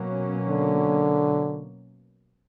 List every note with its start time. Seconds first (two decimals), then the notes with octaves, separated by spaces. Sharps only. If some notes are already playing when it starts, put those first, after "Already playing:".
Already playing: B2 F#3 A#3 C#4
0.49 D3